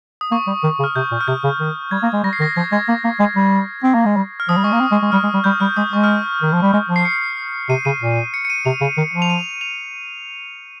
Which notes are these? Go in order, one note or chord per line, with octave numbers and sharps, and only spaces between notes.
D#6
A#3 C#6
G3
D#3
C#3
F6
C3 G6
A#2
F6
C3 G6
C#3
D#3
G3 G#6
A#3
G#3
G3 A#6
C7
D#3 A#6
F3 G#6
G#3 G#6
A#3
A#3
G#3
G3
C4
A#3
G#3
G3
F6
F3 D#6
G3
G#3 C#6
A#3
C4
G#3
G#3
G3 F6
G#3
G3
G3 G6
G3 F6
G#3 D#6
G#3 C#6
F6
D#6
D#3
F3
G3
G#3 F6
F3
C7
C#7
C3 D#7
C#3 D#7
A#2
C#7
C#7
D#7
C3 F7
C#3
D#3
F3
F7
D#7
F7